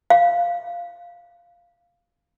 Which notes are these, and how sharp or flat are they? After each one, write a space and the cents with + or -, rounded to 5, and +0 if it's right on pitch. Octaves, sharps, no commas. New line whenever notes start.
F5 -5